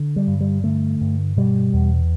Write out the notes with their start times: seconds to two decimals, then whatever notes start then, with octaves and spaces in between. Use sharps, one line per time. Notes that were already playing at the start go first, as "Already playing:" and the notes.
Already playing: D3
0.16 G3
0.27 G2
0.41 G3
0.64 D3 A3
1.01 G2
1.37 B2 G3
1.74 E2